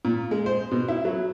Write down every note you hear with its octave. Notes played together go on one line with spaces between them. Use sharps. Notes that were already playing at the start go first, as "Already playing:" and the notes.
A#2
G#3
C5
B2
E4
F#3